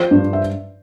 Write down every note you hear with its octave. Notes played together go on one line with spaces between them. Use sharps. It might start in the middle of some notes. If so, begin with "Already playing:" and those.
Already playing: F3 C5
G2
E5